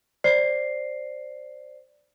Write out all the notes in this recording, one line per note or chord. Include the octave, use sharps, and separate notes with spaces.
C5 D5 C7